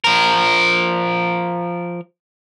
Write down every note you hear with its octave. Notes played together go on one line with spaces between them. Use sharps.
F3 A#4